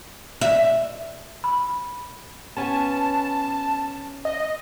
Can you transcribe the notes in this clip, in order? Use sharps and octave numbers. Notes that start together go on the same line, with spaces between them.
E5
B5
B3 C#4 G#5 A5
D#5